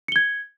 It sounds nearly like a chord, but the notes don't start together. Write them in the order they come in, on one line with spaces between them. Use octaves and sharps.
C#7 G7 G#6